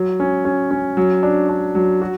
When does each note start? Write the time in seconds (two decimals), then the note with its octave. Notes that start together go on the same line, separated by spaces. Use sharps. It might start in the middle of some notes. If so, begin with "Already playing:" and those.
Already playing: F#3
0.20 C#4
0.45 C#4
0.71 C#4
0.97 F#3
1.23 D4
1.49 D4
1.75 F#3
2.02 F#4